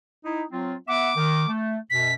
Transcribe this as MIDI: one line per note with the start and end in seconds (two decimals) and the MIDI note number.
0.25 0.42 63
0.25 0.42 64
0.52 0.74 54
0.52 0.74 60
0.52 0.74 65
0.88 1.10 59
0.88 1.10 76
0.88 1.10 78
0.88 1.51 86
1.16 1.46 51
1.48 1.77 57
1.90 2.13 42
1.90 2.13 47
1.90 2.14 95